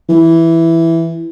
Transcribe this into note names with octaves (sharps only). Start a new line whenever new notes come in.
E3